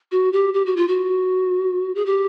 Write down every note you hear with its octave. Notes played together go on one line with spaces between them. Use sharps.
F#4
G4
G4
F#4
F4
F#4
G#4
G4